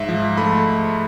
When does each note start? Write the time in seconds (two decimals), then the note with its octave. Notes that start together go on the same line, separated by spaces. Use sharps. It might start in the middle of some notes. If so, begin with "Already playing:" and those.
Already playing: G#2 E5
0.09 F3
0.37 A3 B5